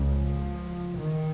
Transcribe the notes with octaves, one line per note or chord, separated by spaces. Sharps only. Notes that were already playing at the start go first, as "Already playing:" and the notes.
Already playing: C#2 C#3
F3
D#3